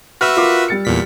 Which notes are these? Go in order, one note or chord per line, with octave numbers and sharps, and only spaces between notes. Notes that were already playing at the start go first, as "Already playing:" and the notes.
F#4 B4 E5 E6 F6
F4 A#4 D6
G3 A6 C#7
E2 A#2 B6